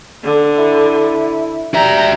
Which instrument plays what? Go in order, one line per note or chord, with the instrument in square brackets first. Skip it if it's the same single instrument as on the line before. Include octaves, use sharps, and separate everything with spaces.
[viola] D3
[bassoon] E4
[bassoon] G3 [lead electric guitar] F#4 E5 [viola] G5 A#5